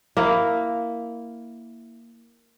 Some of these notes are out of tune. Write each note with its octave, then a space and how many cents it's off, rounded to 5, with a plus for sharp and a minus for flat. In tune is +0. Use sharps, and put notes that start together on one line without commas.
A#3 +0 E4 +0